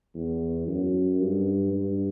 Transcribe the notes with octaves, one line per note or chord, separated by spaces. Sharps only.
E2
F#2
G2
G2